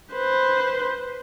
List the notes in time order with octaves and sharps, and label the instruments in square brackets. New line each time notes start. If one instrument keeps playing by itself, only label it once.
[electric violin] B4 C5